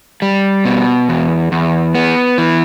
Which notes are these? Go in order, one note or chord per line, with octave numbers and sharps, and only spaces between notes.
G3
B2
E2
E2
B3
E3